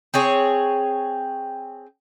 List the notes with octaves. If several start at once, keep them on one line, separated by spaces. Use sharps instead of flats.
C4 G#4 C#5